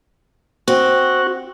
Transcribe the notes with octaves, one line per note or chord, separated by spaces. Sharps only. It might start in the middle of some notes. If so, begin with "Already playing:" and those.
C4 F#4